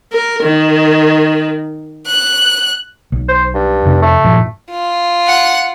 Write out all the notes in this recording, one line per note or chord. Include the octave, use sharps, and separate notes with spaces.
A#4
D#3
F#6
B1
C5
G2
F2 C3
A3
G2 A#2 F3
F4
F#5